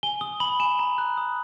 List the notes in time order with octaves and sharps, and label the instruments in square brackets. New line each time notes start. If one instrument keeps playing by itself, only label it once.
[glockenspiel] G#5 G7
D#6 G7
B5 F#7
G#5 E7
A#5
F#6
D#6